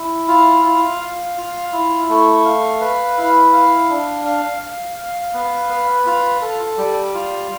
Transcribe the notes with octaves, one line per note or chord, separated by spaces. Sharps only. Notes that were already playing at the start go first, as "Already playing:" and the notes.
Already playing: E4
F4
F4
F5
F4
E4
A3
F5
B4
E4
F5
D4
F5
F5
F5
B3
B4
F4
A4
G3
F4